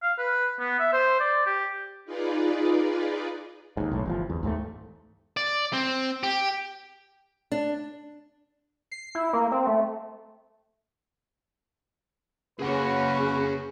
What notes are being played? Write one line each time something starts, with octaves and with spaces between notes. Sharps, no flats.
F5
B4
B3
E5
C5
D5
G4
D#4 F4 G#4 B4 D5
D#2 G#2
B1 A2
G1 E3 F3
E2
D#2 G#2 E3 A3
D5
C4
G4
D4
C7
E4
A#3
C4
A3
C#3 A#3 C#4 F#4 G#4 B4 F#5